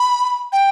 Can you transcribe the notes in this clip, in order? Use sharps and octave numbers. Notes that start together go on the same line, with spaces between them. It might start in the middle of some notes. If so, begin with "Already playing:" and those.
Already playing: B5
G5